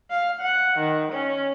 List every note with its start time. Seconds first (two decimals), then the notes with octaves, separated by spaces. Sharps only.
0.11 F5
0.41 F#5
0.78 D#3
1.13 C#4